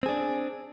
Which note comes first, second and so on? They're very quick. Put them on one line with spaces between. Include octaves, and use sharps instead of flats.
C4 G#4 D4